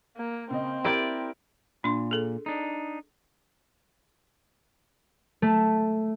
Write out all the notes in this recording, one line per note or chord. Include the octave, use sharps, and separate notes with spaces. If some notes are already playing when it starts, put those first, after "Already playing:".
A#3
C#3 C4 D#5
E4 G4 A#4 D5 G5 D7
A#2 D4 C6
G#4 A4
D4 D#4
A3